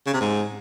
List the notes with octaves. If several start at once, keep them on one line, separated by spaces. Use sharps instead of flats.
C#3
C3
G#2